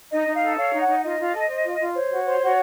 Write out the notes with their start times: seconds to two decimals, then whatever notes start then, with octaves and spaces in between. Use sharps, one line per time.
0.11 D#4 D#5
0.26 D#4
0.34 F5
0.42 A4
0.57 C#5 F5
0.73 D#4
0.80 F#5
0.87 D#4
1.02 F4 D#5
1.18 F4
1.33 A4
1.49 C5
1.65 F4
1.79 F4
1.94 C5 C#5
2.10 F#4
2.26 C5
2.41 F#4